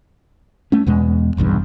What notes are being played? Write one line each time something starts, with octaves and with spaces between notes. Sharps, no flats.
A3 C#4
E2 B2 G#3
F1 B1 E2 G2